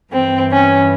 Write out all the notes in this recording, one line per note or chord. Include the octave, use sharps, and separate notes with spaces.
G2 E3 C4
C#4